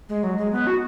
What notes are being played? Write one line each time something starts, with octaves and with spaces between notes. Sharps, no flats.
G#3
F#3
G#3
B3
F#4